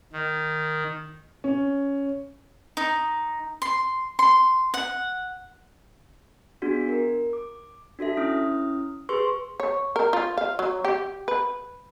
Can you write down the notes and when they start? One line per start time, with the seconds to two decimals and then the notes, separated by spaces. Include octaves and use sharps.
0.12 D#3
1.44 C#4
2.77 D#4
3.62 C6
4.19 C6
4.74 F#5
6.62 B3 D4 F#4 G#4
6.89 A#4
7.33 D6
7.99 D4 F#4 A4 E5
8.17 C#4 E4 D#6 F6
9.09 G4 G#4 B4 C6 C#6 E6
9.60 C#5
9.96 A#4
10.13 F4
10.38 F5
10.59 F#3
10.85 G4
11.28 B4